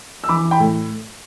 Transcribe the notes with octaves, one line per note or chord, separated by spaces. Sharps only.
E6
E3 B5 D6
E3
G5 B5
A2